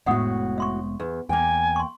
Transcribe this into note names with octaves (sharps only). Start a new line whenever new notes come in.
F1 A2 G#3 B3 F#4 E5 F#5 D#6
E5 C6 C#6
E2
E2 A#3 G5 G#5
C6 C#6